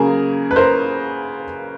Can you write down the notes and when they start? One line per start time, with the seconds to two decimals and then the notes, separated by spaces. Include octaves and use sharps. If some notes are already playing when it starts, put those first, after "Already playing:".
Already playing: C#3 F#3 A#3 G#4 A#4
0.51 B4
0.56 A#4 C5